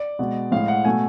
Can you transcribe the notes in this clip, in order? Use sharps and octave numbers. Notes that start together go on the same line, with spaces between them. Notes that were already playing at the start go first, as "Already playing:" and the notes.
Already playing: D5
B2 G#3
A2 G#3 F5
F#5
B2 A3 G#5